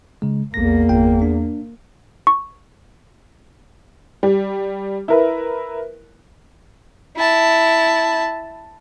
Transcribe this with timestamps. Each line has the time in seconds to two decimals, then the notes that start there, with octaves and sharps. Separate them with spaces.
0.22 C#3 G#3
0.54 A#1 E2 A#3 A#6
0.89 G1 G5
1.22 D4
2.27 C#6
4.23 G3
5.08 E4 A#4 B4
7.16 E4 A5